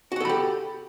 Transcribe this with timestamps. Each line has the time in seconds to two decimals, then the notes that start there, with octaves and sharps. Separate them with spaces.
0.12 F#4
0.16 F#5
0.21 A4
0.25 B5
0.29 G4